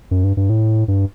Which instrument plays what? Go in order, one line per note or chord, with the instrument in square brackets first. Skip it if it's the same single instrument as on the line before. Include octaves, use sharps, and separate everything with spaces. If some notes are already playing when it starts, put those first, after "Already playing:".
[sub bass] F#2
G2
G2
A2
G2